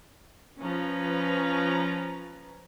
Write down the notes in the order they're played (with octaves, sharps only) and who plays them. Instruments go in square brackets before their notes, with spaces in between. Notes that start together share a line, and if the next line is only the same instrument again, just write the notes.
[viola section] F3 C#4 B4 A#5